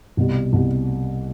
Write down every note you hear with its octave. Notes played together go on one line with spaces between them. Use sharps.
C2 B2 G3
C2 B2 G3